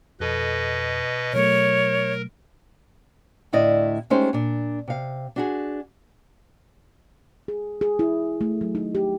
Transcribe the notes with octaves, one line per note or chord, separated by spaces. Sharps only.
F2 B2 A4 B4 D#5
B2 F#3 A3 A#4 C#5
D2 A2 E4 D5 D#5
G#3 A3 C#4 D#4 G4 C5
A#2 D4
C3 F5
D4 F#4 G#4
G#4
G#4
E4
A3
F#3
D#4
G4